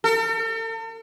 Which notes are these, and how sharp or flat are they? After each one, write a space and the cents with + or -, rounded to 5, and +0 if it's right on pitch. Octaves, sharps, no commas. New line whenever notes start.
A4 +45